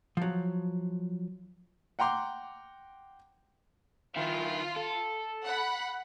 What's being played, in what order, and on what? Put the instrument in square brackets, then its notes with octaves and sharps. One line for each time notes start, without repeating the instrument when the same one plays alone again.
[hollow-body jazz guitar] F3 F#3
[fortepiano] F#5 G5 A#5 C6 D6
[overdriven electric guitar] D#3 E4 [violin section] F4
[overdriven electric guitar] A4
[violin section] F#5 B5